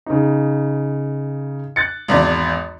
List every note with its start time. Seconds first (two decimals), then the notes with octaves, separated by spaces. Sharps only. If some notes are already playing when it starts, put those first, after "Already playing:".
0.06 C#3 D#4
1.76 F#6 A6 C#7
2.08 G#1 E2 D4